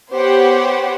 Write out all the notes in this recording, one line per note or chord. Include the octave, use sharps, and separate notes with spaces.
B3 G4 C5 C#5 F#5